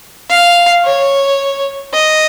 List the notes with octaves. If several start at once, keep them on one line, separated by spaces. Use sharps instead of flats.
F5
C#5
D#5